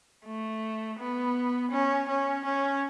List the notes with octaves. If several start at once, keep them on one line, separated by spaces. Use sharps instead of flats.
A3
B3
C#4
C#4
C#4